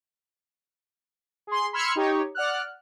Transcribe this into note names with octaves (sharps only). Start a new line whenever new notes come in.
G#4 C6
B5 C6 E6 F6 G#6 C#7
D#4 G4 C#5
D5 F#5 F6 F#6